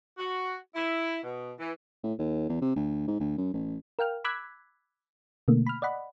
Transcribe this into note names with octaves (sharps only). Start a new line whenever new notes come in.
F#4
E4
B2
E3
A2
D#2
E2
C3
D2
G#2
D2
F#2
A1
A#4 F5 G5 F6
B5 D6 E6 F#6 G#6 B6
B2 D3 A3 A#3
B5 F6
D5 D#5 F#5 B5